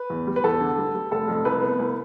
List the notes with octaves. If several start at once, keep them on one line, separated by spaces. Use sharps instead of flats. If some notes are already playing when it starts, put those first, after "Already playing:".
Already playing: B4
E2
G3
B4
E2 A4
D3
G3
G3
F1 A4
F2
C2 B4
B3
C2